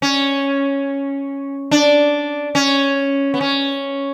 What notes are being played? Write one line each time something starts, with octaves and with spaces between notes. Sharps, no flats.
C#4
D4
C#4
B3
C#4